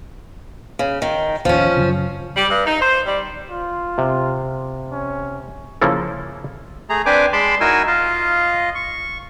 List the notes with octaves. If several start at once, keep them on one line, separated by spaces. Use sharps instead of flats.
C#3
D#3
A1 D#2 F3 C#4
F#2 C#3
G3
G2
D#4
C5
G3
F4
C3
C#4
C#3 F3 A#3 E4 A4
A3 G#4 A#5
C4 D4 B4 C5 G#5 D6
G#3 A5 B5 C6 D6
D#4 E4 F#4 A#4 G#5 E6
F4 D#5 F5
C#6